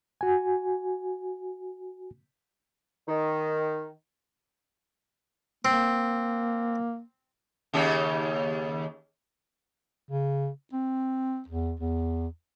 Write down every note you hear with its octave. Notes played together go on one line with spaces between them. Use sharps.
F#4 G#5
D#3
A#3 C4
D#2 C#3 G4
C#3
C4
E2
E2